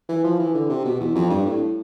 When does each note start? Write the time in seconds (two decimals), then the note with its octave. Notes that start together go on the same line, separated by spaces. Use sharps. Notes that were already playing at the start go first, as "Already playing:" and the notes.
0.09 E3
0.24 F3
0.39 E3
0.55 D3
0.70 C3
0.85 B2
1.00 E2
1.15 F2
1.30 G2
1.46 A2